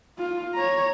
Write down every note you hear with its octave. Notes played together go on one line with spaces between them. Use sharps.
F4
C#5 A#5